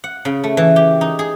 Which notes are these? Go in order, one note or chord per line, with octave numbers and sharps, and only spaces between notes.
F#5
C#3
A3
E3
G4
D#4
G#4